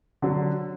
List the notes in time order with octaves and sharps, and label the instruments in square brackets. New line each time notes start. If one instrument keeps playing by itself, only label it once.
[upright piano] D3 F#3